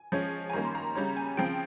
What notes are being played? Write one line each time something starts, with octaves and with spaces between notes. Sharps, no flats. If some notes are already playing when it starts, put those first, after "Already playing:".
Already playing: G#5
F3 G#3 C#4
G#5
D#3 G3 A#3 C#4 A#5
C6
A#5
C#3 G3 C#4 A#5
G#5
C#3 F3 C4 G5